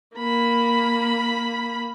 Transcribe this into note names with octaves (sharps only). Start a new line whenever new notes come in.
A#3 B5